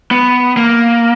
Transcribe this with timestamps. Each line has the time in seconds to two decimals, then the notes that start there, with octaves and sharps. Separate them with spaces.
0.11 B3
0.57 A#3